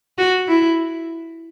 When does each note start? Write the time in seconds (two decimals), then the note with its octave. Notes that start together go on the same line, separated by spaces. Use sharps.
0.18 F#4
0.48 E4